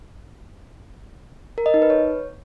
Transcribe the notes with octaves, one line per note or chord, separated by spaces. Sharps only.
A#4
D#5
D#4
B4
C#5